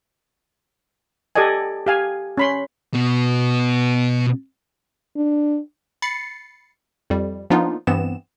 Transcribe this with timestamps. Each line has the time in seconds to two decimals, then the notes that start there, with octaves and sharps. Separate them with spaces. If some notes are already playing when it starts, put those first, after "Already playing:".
1.35 G4 A4 D5 D#5 G#5
1.87 G4 F5 G#5
2.37 C#4 B5 C6
2.94 B2 B3
5.17 D4
6.02 B5 A6 C7 C#7
7.10 F2 G3
7.50 F3 A#3 B3 D4 D#4 F4
7.87 G2 E3 B3 C4 E7